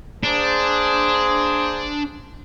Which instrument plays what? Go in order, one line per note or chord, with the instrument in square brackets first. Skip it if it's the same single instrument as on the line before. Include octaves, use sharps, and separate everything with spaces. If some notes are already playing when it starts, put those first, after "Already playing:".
[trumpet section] A#3 G#4 C5 [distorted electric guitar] D4